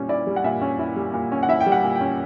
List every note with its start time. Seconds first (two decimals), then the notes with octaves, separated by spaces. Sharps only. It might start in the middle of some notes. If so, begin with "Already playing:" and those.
Already playing: A#2 G3 C#4
0.09 E4 D5
0.27 G3
0.36 F#5
0.44 A#2 E5
0.62 C#4
0.79 E4
0.96 G3
1.13 A#2
1.32 C#4
1.43 F#5
1.49 E4 E5
1.60 G5
1.66 G3
1.72 F#5
1.84 A#2
1.95 G5
2.01 C#4